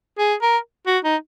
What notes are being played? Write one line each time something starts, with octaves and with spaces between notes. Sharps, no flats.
G#4
A#4
F#4
D#4